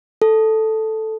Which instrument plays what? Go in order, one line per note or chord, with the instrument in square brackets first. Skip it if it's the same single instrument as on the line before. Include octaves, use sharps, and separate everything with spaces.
[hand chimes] A4